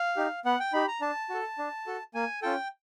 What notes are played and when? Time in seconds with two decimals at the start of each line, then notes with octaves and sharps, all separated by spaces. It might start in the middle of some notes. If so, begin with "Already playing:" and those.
Already playing: F5
0.16 D#4 G4
0.45 B3 F#5
0.60 G5
0.73 D#4 G4 B5
0.88 A#5
1.01 D4 A5
1.30 F#4 A4
1.58 D4
1.87 F#4 A4
2.14 A#3 G#5
2.42 C#4 F4 A4 G5